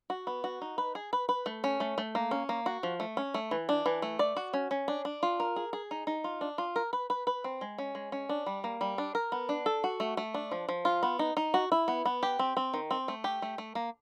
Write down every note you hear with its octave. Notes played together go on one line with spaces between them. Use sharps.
F#4
B3
F#4
D#4
B4
G#4
B4
B4
A3
C#4
A3
A3
A#3
C#4
A#3
F#4
F3
A3
C#4
A3
E3
D4
E3
A3
D5
F#4
C#4
C#4
D4
D4
F4
A#4
G#4
G#4
D#4
D#4
F4
D4
F4
A#4
B4
B4
B4
C4
G#3
C#4
G#3
C#4
D4
G3
A#3
G3
D4
A#4
B3
D4
A4
F#4
A3
A3
D4
F3
F3
F4
B3
D#4
D#4
F#4
E4
B3
B3
G4
C4
C4
D#3
C4
A3
G4
A3
A3
A#3